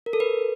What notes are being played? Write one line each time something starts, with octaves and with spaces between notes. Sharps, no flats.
A#4
A4
B4